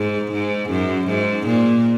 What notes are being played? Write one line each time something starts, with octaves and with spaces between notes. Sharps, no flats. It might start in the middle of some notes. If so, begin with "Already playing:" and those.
Already playing: G#2
G#2
F#2
G#2
A#2